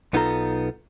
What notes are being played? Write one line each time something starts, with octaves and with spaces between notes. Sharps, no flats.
B1 B3 D#4 F4 A4 A#5